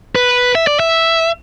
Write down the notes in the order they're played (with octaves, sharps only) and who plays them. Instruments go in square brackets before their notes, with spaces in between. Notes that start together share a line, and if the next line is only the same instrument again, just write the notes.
[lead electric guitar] B4
E5
D5
E5